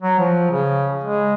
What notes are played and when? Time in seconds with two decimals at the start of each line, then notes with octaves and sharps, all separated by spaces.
0.02 F#3
0.19 F3
0.51 C#3
1.04 G#3